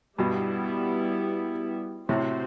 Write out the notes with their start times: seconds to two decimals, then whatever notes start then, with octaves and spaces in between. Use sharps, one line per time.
0.18 G2 B2 G3 B3 E4
2.09 A2 C3 C4 F#4 C5